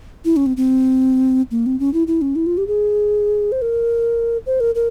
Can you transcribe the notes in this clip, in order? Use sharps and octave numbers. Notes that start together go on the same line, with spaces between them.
E4
C#4
C4
C4
A#3
C4
C#4
E4
E4
C#4
E4
F4
G4
G#4
C5
A#4
C5
A#4
A#4